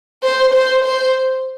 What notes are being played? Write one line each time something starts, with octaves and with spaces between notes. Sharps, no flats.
C5
C5
C5